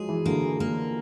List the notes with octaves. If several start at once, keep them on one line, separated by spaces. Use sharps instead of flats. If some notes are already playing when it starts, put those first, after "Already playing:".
Already playing: F3 F#3 G#3 G#4
E3
D3 A#3
A#3